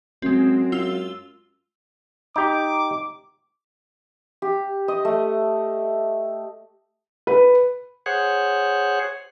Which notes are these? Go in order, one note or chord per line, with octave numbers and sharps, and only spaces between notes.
F#2 G#3 C4
F4 E6 G7
D#4 G4 D6
G4
D#5
A3
B4
G#4 C5 C#5 F#5